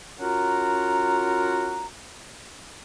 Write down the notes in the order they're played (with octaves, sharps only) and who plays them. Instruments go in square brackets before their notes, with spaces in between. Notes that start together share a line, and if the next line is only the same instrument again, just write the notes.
[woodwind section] C#4 F4 F#4 A#4 F#5 A#5